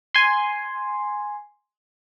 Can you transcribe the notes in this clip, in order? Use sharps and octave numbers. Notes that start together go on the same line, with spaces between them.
G#5 C6